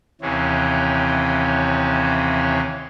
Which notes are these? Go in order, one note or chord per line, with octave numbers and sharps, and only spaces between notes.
D#2 C3 E3 C4 C#4